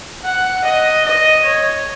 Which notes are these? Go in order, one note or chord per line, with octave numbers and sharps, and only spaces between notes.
F#5
D#5
D#5
C#5